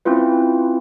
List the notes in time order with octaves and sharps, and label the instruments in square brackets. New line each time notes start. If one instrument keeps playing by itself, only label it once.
[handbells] C4 C#4 E4 F4 B4